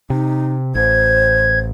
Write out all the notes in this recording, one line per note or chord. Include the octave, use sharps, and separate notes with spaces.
C3 D#4
A1 C5 G#6